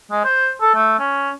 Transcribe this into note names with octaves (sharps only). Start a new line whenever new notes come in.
G#3
C5
A4
A3
C#4